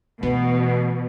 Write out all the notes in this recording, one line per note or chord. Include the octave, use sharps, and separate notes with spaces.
B2 E3 A3 B3